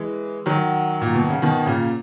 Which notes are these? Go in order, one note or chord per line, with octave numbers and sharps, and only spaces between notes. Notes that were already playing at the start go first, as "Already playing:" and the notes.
Already playing: E3 G#3
D#3 F#3
A#2
B2
C#3
B2 D#3
A#2 C#3